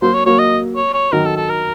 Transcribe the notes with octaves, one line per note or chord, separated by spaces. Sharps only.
F#3 A#3 C5
C#5
F#3 A#3 C#5
D#5
C#5
C#5
D#3 F#3 A#4
A4
A4
A#4